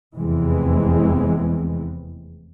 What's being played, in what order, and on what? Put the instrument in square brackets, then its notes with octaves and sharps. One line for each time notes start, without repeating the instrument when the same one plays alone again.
[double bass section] F1 E2 E3 G#3 C4